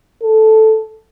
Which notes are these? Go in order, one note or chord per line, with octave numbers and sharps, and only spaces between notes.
A4